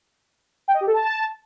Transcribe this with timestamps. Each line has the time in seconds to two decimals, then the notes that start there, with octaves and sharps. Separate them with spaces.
0.68 G5
0.74 D#5
0.81 G4
0.87 A4
0.94 A5